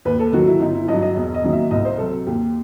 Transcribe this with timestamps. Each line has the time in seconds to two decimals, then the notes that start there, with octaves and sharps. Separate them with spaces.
0.05 D#2 B4
0.19 A4
0.33 D#3 F#3 F#4
0.47 E4
0.60 G1 D#4
0.74 E4
0.88 G2 F#3 D#5
1.02 D#5
1.16 E1 D#5
1.34 D#5
1.44 D#2 D#3 F#3
1.53 E5
1.71 C2 D#5
1.85 C5
1.98 C3 F#3 A4
2.26 D#2 G4